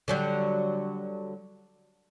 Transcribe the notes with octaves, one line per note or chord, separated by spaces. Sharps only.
D3 F#3 G3